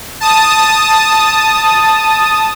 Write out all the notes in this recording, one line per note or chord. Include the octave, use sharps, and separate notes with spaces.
A5 D#6